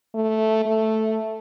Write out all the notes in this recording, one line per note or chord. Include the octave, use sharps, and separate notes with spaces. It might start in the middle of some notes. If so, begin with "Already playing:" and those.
A3
A3